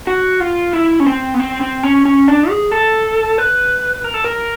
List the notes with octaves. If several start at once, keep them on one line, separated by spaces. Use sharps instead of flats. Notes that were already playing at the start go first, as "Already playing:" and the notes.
F#4
F4
E4
C#4
C4
B3
C4
C4
C#4
C#4
D4
G#4
A4
B4
A#4
A4
A#4